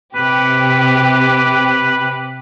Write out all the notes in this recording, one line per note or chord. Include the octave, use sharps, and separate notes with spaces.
C3 G4 B4